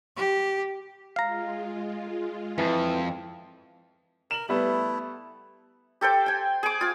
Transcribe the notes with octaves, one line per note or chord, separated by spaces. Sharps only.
G4
G#3 F4 F5 A#5
F2 E3
A#4 E7 F#7
G3 A3 B3 E4
G4 A4 C5 G5
G5 G#5
G#4 D6
F4 G#5